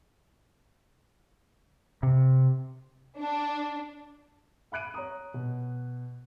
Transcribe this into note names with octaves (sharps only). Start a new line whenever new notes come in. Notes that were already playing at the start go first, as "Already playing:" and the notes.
C3
D4
E5 B5 F#6 D7 D#7
C#5 A#5 D#6
B2